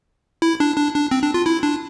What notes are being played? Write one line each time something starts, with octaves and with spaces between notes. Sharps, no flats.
E4
D4
D4
D4
C4
D4
F4
E4
D4